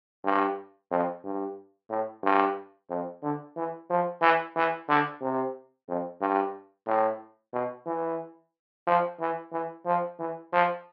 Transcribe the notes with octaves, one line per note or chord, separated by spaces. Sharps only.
G2
F2
G2
A2
G2
F2
D3
E3
F3
E3
E3
D3
C3
F2
G2
A2
B2
E3
F3
E3
E3
F3
E3
F3